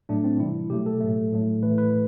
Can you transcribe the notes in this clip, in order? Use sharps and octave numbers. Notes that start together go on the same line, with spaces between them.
A2 F#3 A3 D4
C4
C3 E3 G3 E4
B2 F#3 A3 G4
A4
A2 F#3 A3
A2 F#3 A3
A2 E3 A3 B4
B4